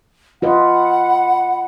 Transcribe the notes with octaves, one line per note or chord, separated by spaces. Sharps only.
F4 B4 D#5 F#5 B5